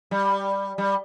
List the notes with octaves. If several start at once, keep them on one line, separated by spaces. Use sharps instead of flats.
G3
G3